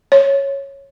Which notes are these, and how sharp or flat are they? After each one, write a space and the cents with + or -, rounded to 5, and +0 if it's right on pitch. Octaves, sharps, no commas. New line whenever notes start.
C#5 -5